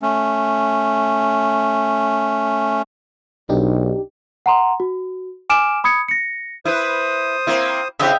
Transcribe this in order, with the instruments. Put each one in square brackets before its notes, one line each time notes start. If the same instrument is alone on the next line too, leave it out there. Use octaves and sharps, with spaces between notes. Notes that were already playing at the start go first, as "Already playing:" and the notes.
[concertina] A3 C#4
[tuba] B1 [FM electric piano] D4 D#4 G4
[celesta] F#5 A#5 C6
F#4
G#5 D6 F6 D7 E7
B5 D#6 G#6 C#7
A#6 C#7
[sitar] E4 B4 [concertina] C5 D#6
[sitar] A#3 C4 E4
[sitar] C#3 C4 E4 [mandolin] G4 D#5 E5